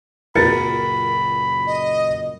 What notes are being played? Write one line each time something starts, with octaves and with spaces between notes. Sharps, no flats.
C#2 F#2 A#2 A#4 B5 A6 C#7
D#5